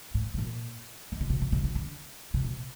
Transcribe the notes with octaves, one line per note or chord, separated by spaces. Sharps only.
A2
C3
A#2
D#3
D3
C3
C3
C3
D3
D3
C3
A#2